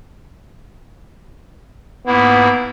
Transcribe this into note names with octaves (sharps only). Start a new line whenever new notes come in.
G#2 A#3 B3 E4